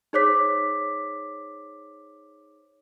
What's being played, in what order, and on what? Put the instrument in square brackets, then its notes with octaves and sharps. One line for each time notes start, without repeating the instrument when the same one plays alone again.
[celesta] D#4 G#4 C5 C#5 D6 B6